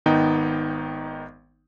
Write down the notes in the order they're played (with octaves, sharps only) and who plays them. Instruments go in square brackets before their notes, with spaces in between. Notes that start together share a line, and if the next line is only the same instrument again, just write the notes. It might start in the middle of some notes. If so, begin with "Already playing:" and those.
[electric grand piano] G#1 D#3 B3 D#4 G5